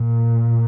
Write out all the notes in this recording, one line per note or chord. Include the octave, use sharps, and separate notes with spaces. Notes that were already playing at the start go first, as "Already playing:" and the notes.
Already playing: A#2